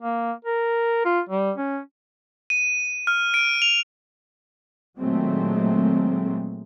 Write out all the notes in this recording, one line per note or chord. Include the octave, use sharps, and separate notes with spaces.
A#3
A#4
F4
G3
C#4
D#7
F6
D7
F7
A#2 D#3 F#3 G#3 A3 C4